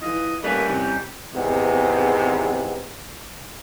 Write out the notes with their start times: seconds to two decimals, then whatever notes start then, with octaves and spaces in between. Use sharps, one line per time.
0.02 E3 F4 D#5
0.44 G3 A3 A#3 C#4 B4
0.68 E2 C3 G5
1.35 G#1 E2 G#2 C3 B3